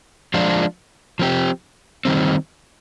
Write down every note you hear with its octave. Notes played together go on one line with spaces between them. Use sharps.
F3 G#3 D4 F4
F3 C4 G4
D#3 G3 C4